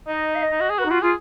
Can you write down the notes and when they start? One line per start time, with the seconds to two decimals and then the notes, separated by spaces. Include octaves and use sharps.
0.07 D#4 D#5
0.35 F5
0.43 D#5
0.51 D#4
0.60 F#4
0.70 G#4
0.79 F#4 B4
0.85 D#4
0.90 F4 F#4
1.02 F4 G#4